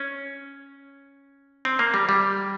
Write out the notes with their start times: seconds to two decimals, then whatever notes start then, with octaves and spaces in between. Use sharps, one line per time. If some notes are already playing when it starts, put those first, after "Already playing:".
Already playing: C#4
1.65 C4
1.79 A#3
1.94 G3
2.09 G3